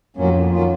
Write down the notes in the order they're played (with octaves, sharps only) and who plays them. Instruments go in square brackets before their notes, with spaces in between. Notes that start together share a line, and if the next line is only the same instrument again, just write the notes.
[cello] F2 [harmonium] A2 F#3 A#3 C#4
[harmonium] D#3 F#3 A#3 C#4 F4